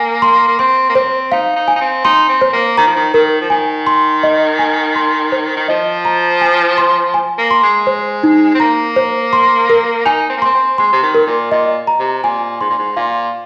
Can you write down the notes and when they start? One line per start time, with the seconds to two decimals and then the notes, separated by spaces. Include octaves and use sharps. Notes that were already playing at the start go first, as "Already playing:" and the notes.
Already playing: A#3 G#5
0.22 C6
0.48 A#3
0.59 C4 C6
0.89 A#3
0.95 C4 C5
1.32 D#4 F5
1.56 D#4
1.68 G#5
1.76 D#4
1.81 C4
2.04 D#4 C6
2.29 C4
2.41 C5
2.53 A#3
2.77 D#3 A#5
2.87 F3
2.96 D#3
3.14 D#3 A#4
3.41 F3
3.50 D#3 G#5
3.87 C6
4.23 D#5
4.59 G#5
4.95 C6
5.32 C5
5.56 D#3
5.68 F3 D#5
6.05 A#5
6.41 G#5
6.78 C6
7.14 G#5
7.38 A#3
7.51 C6
7.63 G#3
7.87 C5
8.23 D#4
8.55 C4
8.60 A#3 A#5
8.96 C5
9.33 C6
9.69 A#4
10.05 D#4 G#5
10.29 C4
10.37 A#3
10.42 C4 C6
10.54 C4
10.78 G#3 C6
10.93 C3
11.03 D#3
11.14 A#4
11.26 A#2
11.51 A#2 D#5
11.87 A#5
11.99 C3
12.23 A#2 G#5
12.60 G#2 C6
12.69 A#2
12.79 G#2
12.96 A#2 F5